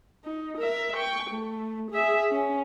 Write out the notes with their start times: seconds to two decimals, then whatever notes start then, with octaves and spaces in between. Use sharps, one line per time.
0.25 D#4
0.58 A#4 E5
0.96 G5 C#6
1.30 A3
1.91 G#4 E5
2.31 C#4